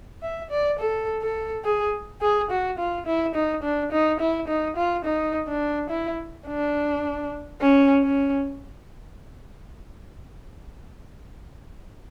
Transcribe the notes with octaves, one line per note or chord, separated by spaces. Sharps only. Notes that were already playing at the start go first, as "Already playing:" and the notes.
E5
D5
A4
A4
G#4
G#4
F#4
F4
E4
D#4
D4
D#4
E4
D#4
F4
D#4
D4
E4
D4
C#4
C#4